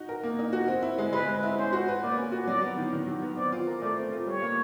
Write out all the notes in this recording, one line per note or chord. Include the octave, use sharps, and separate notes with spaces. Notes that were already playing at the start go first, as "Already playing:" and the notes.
Already playing: D#4 F#4
A#4
A#3
D#4
F#4
C4
E4
G#3
G#3 B4
C4
E4
C#4 C5
F#4
B4
A#3 D5
C#4
F#4
F#3 D5
B3
D#3
D#3
F#3
B3
C4 D5
F4
A#4
A3 D5
C4
F4
G3 C#5
A#3